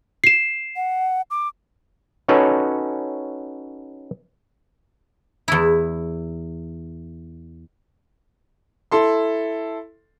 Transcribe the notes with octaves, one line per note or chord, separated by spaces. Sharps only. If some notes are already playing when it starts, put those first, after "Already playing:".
C7 E7
F#5
D6
C#4 D#4 F#4 A4 B4 C#5
E2 E4
E4 A4 C6